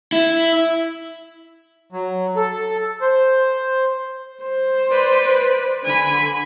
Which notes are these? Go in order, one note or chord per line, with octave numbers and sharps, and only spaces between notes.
E4
F#3
A4
C5
C5
B4 D5
D3 G#5 B5